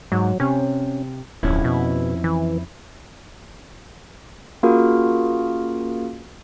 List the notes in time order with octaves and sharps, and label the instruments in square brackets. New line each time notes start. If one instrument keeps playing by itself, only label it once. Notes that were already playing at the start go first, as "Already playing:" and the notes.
[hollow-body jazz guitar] G#2 [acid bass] F#3
[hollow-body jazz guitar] C3 [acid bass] C#4
[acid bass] D1 [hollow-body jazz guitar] F2 C#4 E4
[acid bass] B2
E3
[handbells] A#3 C#4 F4 F#4 G#4 A#4